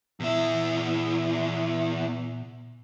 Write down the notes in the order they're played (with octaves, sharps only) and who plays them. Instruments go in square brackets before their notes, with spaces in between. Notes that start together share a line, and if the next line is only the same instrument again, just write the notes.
[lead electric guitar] E2 E4 [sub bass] A#2